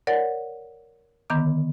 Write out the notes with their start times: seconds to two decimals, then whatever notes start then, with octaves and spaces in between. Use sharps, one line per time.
0.07 A#4 C#5 D5 F#5 A6
1.30 D3 D#3 B3 A#5 D6